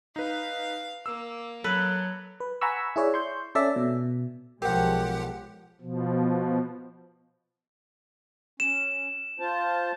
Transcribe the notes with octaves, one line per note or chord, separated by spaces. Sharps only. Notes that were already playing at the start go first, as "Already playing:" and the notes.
D#4 B4 F5
A#3 E6
F#3 A4 B4
B4
F#5 G#5 A#5 B5 C#6 E6
E4 G#4 C#5 D5 E5
C6 C#6 G6
C#4 A4 D5 E5 A5
B2
B1 F3 G#3 G4 A#4 F#5 G5 G6
B2 F3
C#4 E7
F4 C5 A5